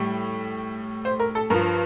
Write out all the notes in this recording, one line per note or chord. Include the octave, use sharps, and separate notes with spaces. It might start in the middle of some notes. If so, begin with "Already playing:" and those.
Already playing: A2 G3
C5
A#4
A4
G2 F3 A#4